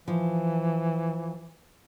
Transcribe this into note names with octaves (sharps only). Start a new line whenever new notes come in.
E3 F3